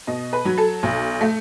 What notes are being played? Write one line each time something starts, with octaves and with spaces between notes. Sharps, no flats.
B2 D#5
B4
F#3
A4
B1
A3